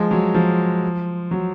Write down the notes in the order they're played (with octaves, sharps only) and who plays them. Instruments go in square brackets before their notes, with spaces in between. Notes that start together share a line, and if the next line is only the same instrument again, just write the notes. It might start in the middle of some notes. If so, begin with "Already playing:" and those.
Already playing: [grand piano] F3 G#3
F#3
F3
F#3